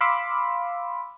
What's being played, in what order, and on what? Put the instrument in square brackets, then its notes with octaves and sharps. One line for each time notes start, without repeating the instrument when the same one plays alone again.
[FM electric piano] F5 B5 C6 D6 E6